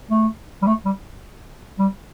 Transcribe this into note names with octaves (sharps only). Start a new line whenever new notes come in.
A3
G3
A3
G3
G3